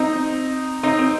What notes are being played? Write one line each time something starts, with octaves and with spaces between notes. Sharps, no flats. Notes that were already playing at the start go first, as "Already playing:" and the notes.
Already playing: C4 D#4
C4 D#4
C4